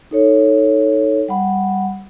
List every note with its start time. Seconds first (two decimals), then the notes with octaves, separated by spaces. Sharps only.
0.11 D#4 A4 C#5
1.28 G3 F#5 B5